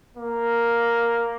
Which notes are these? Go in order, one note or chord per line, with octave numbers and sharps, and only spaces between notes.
A#3